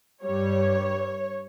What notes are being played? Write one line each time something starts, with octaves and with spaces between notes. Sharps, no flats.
G2 G3 C#5